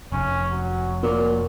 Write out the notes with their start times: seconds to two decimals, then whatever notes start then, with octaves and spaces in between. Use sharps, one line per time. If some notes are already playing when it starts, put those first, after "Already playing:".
0.12 F1 C#4
0.51 F#3
1.03 A#2 F#3